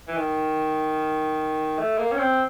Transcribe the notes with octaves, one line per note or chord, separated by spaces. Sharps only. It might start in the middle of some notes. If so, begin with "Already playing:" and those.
E3
D#3
A3
A#3
C#4
C4